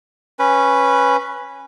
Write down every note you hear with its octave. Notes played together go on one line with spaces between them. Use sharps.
C#4 B4